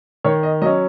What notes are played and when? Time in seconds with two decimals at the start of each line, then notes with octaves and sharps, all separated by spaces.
0.24 D#3 C#5
0.43 D#5
0.62 F#3 D#5
0.66 C#4